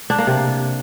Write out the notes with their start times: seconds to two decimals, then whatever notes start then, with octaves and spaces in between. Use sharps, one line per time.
0.10 D4
0.18 A#3
0.27 C3